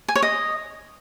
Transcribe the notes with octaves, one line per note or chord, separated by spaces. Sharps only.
G#5
C#5
D#5